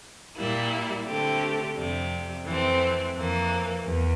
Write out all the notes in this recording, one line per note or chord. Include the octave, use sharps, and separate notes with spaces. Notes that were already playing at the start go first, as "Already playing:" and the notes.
A#2 G3 A#3 E4
D3 A3 C4 G4
F2 C3 G3
F2 E3 A3 C4
F2 E3 A#3
E2